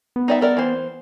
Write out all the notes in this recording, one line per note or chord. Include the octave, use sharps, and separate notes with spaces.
B3
D#4 D5 E5
A4 A#4 D5
E3 C5